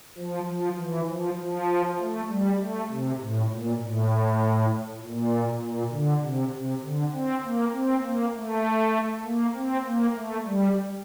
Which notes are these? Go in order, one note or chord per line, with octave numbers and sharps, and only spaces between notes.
F3
F3
E3
F3
F3
A3
G3
A3
C3
A2
A#2
A2
A#2
A#2
D3
C3
C3
D3
C4
A#3
C4
A#3
A3
A#3
C4
A#3
A3
G3